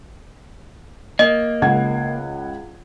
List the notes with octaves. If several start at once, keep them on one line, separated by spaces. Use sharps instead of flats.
A#3 D#5
C#2 F#5 G#6